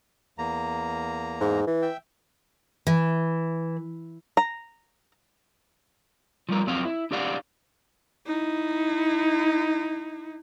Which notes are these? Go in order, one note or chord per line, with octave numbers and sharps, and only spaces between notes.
E2 A#3 A#5
G#2
E3
E5 G5
E3
A#5
F3 G3 A#4
F2 F3 F#3 C4 F5
E4
D4 G4 D5 F5 F#5
D#4 E4